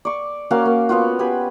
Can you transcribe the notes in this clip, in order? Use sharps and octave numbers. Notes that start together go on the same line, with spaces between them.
D5 C#6
A#3 C#4 F#4 F5
A#3
B3 C#4 F4 F#4
G4 B4 G#5 B5